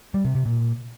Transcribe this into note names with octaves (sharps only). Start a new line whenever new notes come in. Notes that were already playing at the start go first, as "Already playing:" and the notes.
G3
C3
C3
A#2